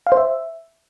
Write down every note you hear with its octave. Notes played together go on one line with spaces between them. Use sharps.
F5
C5
E5